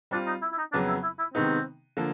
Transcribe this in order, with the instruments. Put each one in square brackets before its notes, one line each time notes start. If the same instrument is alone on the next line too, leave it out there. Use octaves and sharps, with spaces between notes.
[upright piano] G3 C4 F4 [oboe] D4
[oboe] D#4
E4
E4
D#4
[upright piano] F2 C#3 F#3 B3 [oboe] D4
[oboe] E4
E4
E4
[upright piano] C3 D#3 G#3 B3 D#4 [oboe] C4
[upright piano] D3 F3 A#3